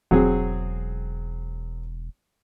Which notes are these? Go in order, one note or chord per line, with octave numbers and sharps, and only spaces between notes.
E1 F#3 C4 G#4